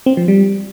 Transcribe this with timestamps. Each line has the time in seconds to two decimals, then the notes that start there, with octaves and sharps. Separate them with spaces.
0.06 C4
0.17 F3
0.28 G3